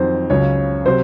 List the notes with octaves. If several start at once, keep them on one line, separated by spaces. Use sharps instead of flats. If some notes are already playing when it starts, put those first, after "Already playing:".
Already playing: F2 D#3 F#3 C5
C#2 C#3 F#3 C#5
C3 F#3 C5